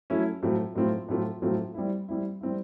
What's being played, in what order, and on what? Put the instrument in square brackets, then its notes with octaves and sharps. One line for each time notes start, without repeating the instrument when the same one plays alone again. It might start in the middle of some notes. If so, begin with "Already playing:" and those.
[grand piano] F#3 A3 C#4 E4
A2 F#3 A3 C4 F4
A2 F#3 A3 C4 F4
A2 F#3 A3 C4 F4
A2 F#3 A3 C4 F4
G3 C4 E4
G3 C4 E4
G3 C4 E4